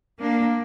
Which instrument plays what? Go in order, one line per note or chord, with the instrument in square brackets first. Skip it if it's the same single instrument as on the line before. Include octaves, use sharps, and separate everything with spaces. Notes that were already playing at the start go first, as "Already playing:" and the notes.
[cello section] A#3 D4